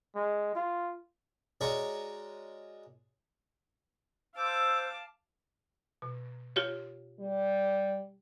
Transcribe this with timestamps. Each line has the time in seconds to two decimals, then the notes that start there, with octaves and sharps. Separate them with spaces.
0.15 G#3
0.55 F4
1.61 G#3 F#4 G#4 A#4 C#5 D5
4.36 C5 F5 A5 D6 E6 G6
6.02 B2
6.56 F4 G4 C#5
7.19 G3